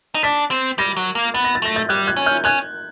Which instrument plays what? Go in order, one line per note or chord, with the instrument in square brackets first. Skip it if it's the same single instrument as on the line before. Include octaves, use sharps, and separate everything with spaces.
[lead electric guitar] D#4
[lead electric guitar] D4 [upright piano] A6 B6
[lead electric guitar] C4
[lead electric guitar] G3 [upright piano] G#6 A#6
[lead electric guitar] F#3
A#3
[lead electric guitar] B3 [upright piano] A6
[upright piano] A#6
A6
[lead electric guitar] A3 [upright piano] A#6
[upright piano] G6 A6
[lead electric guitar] G3 [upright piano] F#6 G#6
[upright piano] F#6 G#6
[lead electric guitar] C#4
[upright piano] F6 G6
[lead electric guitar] C#4 [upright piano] F#6 G#6